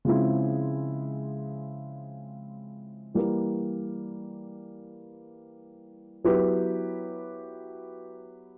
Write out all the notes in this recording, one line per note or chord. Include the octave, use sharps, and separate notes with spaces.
C#3 F3 G#3 C4 E4
E3 G3 A#3
F#3 B3 E4 G4 B4